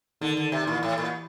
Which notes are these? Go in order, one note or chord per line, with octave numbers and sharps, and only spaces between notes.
D3 D#3
D3
C3
A#2 E3
A2
A#2